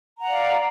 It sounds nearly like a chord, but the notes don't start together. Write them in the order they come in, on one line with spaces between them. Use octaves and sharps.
A#5 F#5 D5 F5